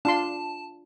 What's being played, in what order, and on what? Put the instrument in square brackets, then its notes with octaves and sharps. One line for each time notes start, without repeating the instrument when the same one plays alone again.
[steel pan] D4 F4 C6 [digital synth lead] A5